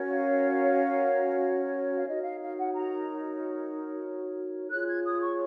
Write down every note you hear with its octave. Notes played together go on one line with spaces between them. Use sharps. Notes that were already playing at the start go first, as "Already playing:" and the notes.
Already playing: C#4 F#4 A#4 C#5
F5
F5
D#4 F#4 A#4 C#5 D#5
F5
F5
F#5
A#5
F4 G#4 C#5 F#6
G#6
D#6
C#6